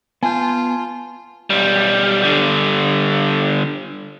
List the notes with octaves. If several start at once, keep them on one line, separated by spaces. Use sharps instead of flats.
B3 F4 G#5 A5 G6
B1 G3
D3 G3